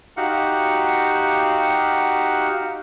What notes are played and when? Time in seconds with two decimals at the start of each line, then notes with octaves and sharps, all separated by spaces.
0.17 D#4 F#4 G4 F5 F#5